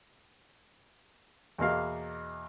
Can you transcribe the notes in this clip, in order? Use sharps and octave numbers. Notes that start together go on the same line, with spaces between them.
E2 B2 A#3 F5